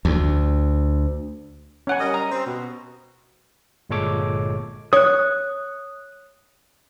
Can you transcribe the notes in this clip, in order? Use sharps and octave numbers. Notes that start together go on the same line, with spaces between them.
D2
C#4 F#5 G#5
G3 A#4 D#5
A#5
C4
B2
G1 A#2 G#3 A4 C#5 D6
C#5 D#6 F#6